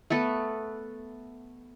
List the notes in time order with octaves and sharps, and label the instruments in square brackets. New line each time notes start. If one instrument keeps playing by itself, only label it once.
[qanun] A3 B3 A4 B4